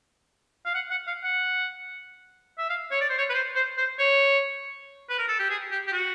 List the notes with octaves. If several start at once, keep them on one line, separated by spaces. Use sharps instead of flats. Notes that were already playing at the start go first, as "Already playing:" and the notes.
F5
F#5
F#5
F5
F#5
E5
F5
C#5
D5
C5
C#5
B4
C5
C5
C5
C#5
B4
A#4
A4
G4
G#4
G4
G4
F#4